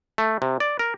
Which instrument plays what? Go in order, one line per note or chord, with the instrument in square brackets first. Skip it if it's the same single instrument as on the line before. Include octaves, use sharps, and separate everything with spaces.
[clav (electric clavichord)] A3
C3
D5
A#4